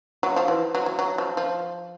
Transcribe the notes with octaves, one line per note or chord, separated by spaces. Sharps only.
F#3
F3
E3
F#3
F#3
F#3
F3
F3